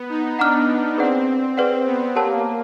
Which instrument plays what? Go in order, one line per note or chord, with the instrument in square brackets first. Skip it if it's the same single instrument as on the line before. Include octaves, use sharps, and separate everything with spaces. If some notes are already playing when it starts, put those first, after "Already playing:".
Already playing: [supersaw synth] B3
D#4
[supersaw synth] D4 [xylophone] F#5 A#5 D6 F6
[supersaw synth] C4 [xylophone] G#4 B4 D5 F#5
[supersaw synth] C4 [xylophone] G#4 B4 D5 F#5
[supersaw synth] B3
[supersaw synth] A#3 [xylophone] G4 A#4 C#5 F#5 A5